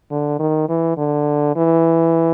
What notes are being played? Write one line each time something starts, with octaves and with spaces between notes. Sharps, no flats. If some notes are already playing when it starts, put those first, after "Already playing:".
D3
D#3
E3
D3
E3